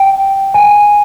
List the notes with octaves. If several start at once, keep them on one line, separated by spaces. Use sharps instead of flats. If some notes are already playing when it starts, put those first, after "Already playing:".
Already playing: G5
G#5